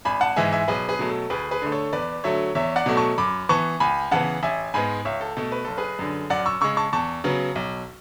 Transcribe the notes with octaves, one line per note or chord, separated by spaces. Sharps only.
G#1 G#5 B5
F#5 A5
G#2 E3 G#3 E5 G#5
E5 G#5
B1 G#4 B4
G#4 B4
B2 F#3 A3
A4
D2 G#4 B4
G#4 B4
D3 A3
A4 C#5
E2 B4 D5
D3 F#3 A3 C#5 E5
E2 C#5 E5
D5 F#5
B2 F#3 A3
A5 C#6
F#2 B5 D6
E3 B3 A5 C#6
C#2 G#5 B5
C#3 E3 B3 F#5 A5
A1 E5 G#5
G#2 G#3 B3 G#5 B5
C#2 C#5 E5
A4
B2 A3 A4
B4
F#1 A4
G#4 B4
F#2 D3
F#2 D5 F#5
C#6 E6
C#3 G#3 C#6 E6
A5 C#6
E2 A5 C#6
C#3 F#3 B3
B1